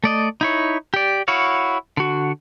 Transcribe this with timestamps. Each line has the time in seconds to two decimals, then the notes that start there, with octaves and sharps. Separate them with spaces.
0.04 A3 D5 D#5
0.41 D#4 E4 C#5
0.94 G4 D5
1.28 E4 F#4 C#5 F5
1.97 D3 F#4